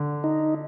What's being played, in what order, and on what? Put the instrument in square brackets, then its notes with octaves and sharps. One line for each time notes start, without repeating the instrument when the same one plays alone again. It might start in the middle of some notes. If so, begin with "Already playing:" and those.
Already playing: [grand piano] D3
[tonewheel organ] D#4